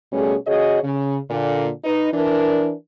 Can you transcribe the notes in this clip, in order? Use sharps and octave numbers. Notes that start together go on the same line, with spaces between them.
B2 G3 A3 C#4 G#4
C#3 F#4 G#4 C#5 D#5
C#3
A#2 D3
D#4 B4
E3 D4 A#4